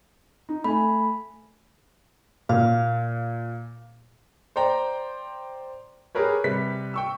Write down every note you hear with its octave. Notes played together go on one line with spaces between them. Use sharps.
D#4
A3 G#5 B5
A#2 F5
C5 D5 G5 A#5
G4 G#4 A#4 B4 C#5
C3 G3 B4 B6
G5 C#6 E6